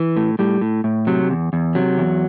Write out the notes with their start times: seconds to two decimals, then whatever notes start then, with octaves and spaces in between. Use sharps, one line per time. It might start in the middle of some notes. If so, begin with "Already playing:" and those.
Already playing: E3
0.17 A2
0.39 A2 G3
0.61 A2
0.84 A2
1.07 C3 F#3
1.30 E2
1.53 E2
1.75 C3 F#3
1.98 E2